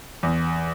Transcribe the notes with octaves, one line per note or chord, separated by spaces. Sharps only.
E2